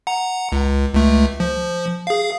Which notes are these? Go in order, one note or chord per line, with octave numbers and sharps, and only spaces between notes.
F#5 A#5
C#2
C#2 A3
F3
G#4 F5